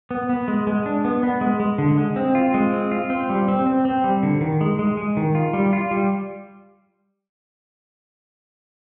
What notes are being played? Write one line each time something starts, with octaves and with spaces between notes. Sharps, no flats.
B3
B3
G#3
G#3
D4
B3
B3
G#3
G#3
D3
G#3
C4
F4
G#3
C4
F4
C4
G3
C4
C4
C4
G3
D3
D#3
G#3
G#3
G#3
D#3
F4
G3
F4
G3